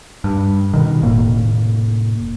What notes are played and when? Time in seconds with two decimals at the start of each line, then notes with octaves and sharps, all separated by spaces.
0.24 G2
0.74 B2 D#3
1.03 F1 A2 A#3